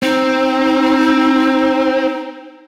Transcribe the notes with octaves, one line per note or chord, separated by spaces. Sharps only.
C4 D#4